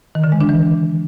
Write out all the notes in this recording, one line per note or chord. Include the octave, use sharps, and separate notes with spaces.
D#3
D3
G#3
D4
E3